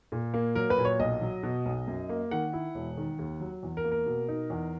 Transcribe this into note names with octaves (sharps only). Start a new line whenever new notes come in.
A#2
A#3
F#3 A#4
B4
A#2
C#5
B1 D#5
F#3
B2
B1
F#2
A#3
D#3 F#5
E4
E1
D#3
D#2
F#3
E2
A#4
A#3
A#4
B2
D#4
E2